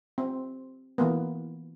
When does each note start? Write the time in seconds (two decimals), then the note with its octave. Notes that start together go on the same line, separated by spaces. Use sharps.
0.18 C4
0.98 E3 A#3 B3